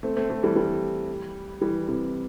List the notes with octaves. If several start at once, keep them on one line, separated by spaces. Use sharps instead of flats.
A3 C4
A3 C4
A3 C4
E3 G3
E3 G3
E3 G3
C3 E3